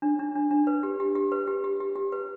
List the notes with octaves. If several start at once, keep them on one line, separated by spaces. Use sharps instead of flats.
D4
D4
D4
D4
B4
G4
G4
G4
B4
G4
G4
G4
G4
B4